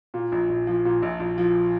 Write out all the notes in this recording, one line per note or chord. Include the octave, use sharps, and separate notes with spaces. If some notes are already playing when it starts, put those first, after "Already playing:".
A#2
A#1
A#1
F3
A#2
A#1
A#1
F3